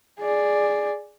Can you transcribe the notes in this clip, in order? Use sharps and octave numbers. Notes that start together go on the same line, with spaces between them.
G#4 D5